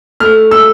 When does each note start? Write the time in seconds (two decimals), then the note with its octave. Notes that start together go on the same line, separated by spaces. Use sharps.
0.20 A3 F6
0.51 E6